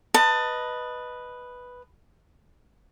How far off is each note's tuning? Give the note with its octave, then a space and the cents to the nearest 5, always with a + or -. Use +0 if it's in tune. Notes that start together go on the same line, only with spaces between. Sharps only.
B4 +0 D#5 +0 A5 +25